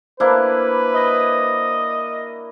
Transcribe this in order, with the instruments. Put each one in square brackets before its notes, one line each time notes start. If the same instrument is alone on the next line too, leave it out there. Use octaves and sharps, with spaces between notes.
[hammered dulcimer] A#3 D4 E4 [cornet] B4 [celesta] C5
[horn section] D#5